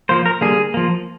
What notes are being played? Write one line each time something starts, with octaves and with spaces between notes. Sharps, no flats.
F3 A#3 C5
A#4
D3 G3 A#3 G#4
F3 A#3